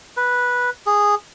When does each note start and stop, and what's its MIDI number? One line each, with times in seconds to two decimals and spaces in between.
0.17 0.70 71
0.86 1.15 68